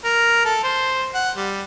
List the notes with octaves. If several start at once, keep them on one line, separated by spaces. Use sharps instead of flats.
A#4
A4
C5
F#5
G3